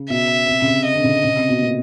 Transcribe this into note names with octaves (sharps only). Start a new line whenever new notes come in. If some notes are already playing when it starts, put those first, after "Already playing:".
Already playing: C#3
B2 E5
C3
C#3
C3
D#5
D3
C#3
C#3
C3
B2
A#2